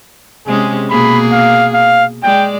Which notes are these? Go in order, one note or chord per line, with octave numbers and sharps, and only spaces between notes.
C3 G#3 C#4 G#4
B2 A#3 G#4 B5
F5
F5
G#3 D5 G5